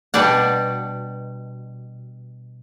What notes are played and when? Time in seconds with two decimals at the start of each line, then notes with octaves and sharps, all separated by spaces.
0.14 B2 G3 D4 D5 F#5